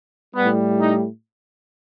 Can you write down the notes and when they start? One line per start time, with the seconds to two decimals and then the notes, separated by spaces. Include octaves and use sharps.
0.35 A2 G3 B3
0.80 D#4